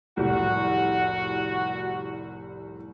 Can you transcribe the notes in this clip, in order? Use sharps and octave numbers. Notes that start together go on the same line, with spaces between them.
F1 C2 A2 F#4